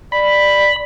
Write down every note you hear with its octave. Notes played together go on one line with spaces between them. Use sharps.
D5 B5